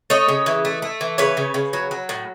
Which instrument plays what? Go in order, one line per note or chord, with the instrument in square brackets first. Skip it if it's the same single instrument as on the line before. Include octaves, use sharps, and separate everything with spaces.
[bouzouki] A3 C#5 D#5
C#3
E3
A3
A3
E3
C#3 B4 C#5
C#3
C#3
F#3
F#3
A2